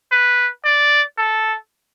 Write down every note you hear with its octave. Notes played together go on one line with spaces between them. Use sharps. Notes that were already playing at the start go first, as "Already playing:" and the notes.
B4
D5
A4